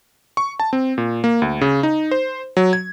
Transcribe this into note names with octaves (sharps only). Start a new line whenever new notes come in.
C#6
A5
C4
A#2
A#3
D2
C#3
D#4
C5
F#3
G#6